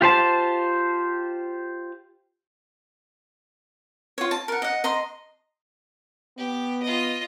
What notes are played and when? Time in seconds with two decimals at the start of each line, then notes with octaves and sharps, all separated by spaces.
0.01 F4 G4 C5 A5
4.18 F4 C#5
4.31 A5
4.48 A#4 F#5
4.62 D#5 F#5
4.84 D#5 A#5 C6
6.38 B3 G4
6.83 F4 D#5